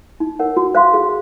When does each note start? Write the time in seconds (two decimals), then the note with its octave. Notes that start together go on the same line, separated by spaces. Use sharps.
0.20 D#4
0.39 A#4 C#5 F#5
0.57 F#4
0.75 C5 F5 C6
0.94 G#4